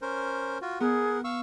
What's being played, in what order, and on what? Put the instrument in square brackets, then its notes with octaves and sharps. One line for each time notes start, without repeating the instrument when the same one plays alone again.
[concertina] C#4 A#4 C5
F4 F#4
[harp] B3 [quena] G#4 [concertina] A#4 F#5
[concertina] F5 C#6 E6